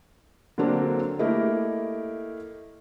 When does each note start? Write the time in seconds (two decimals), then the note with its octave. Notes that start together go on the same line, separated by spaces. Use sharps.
0.58 D3 F#3 A#3 C4 D4
1.19 A3 A#3 E4 G4 A#4 D#5